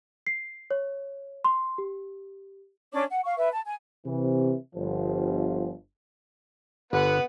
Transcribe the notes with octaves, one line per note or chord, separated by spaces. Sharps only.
C7
C#5
C6
G4
C#4 D4 C#5 D6
F#5
F5 C#6
B4 E5
A5
G#5
C3 E3
G1 F3
G1 D3 B3 B4 F#5